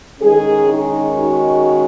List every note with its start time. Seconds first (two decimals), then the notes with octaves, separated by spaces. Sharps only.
0.21 D#3 G#3 C#4 G#4
0.69 D#4
1.16 F#4